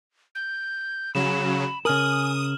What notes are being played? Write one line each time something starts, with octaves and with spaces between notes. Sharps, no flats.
G6
C#3 F#3 B5 E7
C#3 A#4 G#5 D#6 F6 F#7